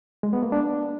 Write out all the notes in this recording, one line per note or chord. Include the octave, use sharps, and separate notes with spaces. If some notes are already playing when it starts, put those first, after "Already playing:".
G#3
B3
A#3
D4